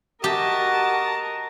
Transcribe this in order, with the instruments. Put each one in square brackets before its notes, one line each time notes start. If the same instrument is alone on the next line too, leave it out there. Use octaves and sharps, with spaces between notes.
[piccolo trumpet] F#4 [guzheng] G4 [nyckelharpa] A#4 D#5 [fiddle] A5